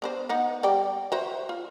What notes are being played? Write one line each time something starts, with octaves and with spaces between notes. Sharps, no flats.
B3 D4 C5
B3 D#4 F#5
G3 D5 G5
F#4 C5 E5
F4